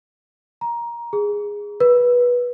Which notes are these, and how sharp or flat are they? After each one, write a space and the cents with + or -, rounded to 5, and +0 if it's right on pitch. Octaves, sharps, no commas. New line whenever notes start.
A#5 +15
G#4 -10
B4 -20